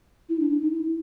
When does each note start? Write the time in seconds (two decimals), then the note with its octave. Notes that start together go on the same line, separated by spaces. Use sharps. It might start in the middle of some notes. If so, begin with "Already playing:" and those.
0.29 E4
0.39 D4
0.50 D4
0.60 D#4
0.70 E4